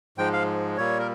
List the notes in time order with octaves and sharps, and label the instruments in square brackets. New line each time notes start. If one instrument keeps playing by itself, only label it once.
[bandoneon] G#2 F3 G#3 G5
F5
A#2 G3 A#3 C#5
A#4